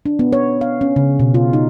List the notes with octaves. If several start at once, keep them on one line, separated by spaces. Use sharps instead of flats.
D4
B3
C#5
F5
C#4
C#3
B2
F4
D#4